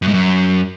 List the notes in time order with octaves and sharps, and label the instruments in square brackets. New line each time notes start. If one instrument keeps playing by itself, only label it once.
[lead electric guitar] F#2
G#2
F#2